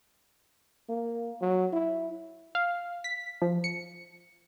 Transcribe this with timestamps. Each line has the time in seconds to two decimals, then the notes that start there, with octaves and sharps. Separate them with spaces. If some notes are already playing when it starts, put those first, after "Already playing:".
0.89 A#3
1.41 F#3
1.73 E4
2.55 F5
3.04 B6
3.42 F3
3.64 C#7